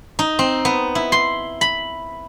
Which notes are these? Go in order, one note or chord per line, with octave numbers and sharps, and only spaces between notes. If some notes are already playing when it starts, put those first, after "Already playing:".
D#4
C4
B3
E4
C6
B5